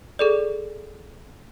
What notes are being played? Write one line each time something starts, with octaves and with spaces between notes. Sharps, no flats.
G#4 A4 D5